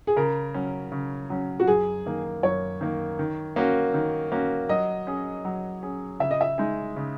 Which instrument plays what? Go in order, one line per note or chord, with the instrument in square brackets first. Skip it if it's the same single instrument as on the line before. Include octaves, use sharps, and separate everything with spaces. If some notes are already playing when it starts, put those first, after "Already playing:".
[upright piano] G#4
[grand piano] C#3 [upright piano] A#4
[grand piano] F#3 C#4
C#3
F#3 C#4
[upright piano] F#4
[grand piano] F#2 [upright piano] G#4
[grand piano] D#3 A#3
[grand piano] F#2 [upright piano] C#5
[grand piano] D#3 A#3
D#3
A#3 C#4 F#4
D#3
A#3 C#4 F#4
[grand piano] F#3 [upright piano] D#5
[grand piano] C#4 G#4
F#3
C#4 G#4
[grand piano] C#3 [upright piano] E5
[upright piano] D#5
E5
[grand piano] G#3 D#4 G#4
C#3